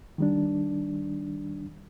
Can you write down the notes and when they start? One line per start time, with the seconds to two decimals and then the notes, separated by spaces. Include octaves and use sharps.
0.18 D#3 G3 D4